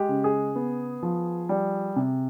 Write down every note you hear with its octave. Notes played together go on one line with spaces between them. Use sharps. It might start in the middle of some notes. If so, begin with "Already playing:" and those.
Already playing: G#3 G4
C#3
G#4
B3
F3
G3
C3